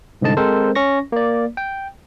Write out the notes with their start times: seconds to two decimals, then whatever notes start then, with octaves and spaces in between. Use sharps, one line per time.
0.21 C2 G#2 D3 D#5 A5
0.37 G#3 C4 A4 A#4 C5
0.75 C#4 C#6 A#6
1.12 A#3 D5
1.57 G5